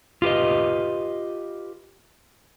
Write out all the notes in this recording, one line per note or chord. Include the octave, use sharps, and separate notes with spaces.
F4 G4 B4 D#5